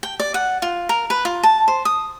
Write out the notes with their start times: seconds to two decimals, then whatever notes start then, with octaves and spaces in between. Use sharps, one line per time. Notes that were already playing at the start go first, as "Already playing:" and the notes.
0.03 G5
0.20 D5
0.34 F#5
0.62 F4
0.89 A#4
1.10 B4
1.25 F4
1.43 A5
1.68 C5
1.85 D#6